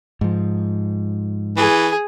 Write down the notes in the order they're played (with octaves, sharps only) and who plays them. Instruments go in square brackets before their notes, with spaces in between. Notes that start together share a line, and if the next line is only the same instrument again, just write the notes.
[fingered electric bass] G#2 F3
[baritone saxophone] E3 [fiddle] G#4